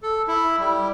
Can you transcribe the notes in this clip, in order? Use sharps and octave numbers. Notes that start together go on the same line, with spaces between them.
A4
E4
G3